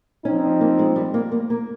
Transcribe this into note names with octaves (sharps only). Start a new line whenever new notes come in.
F3 C4 C#4 D#4
A#3
G#3
G3
A#3
A#3
A#3